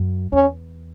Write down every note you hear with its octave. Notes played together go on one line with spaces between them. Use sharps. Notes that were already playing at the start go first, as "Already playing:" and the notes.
Already playing: F#2
E2 C#4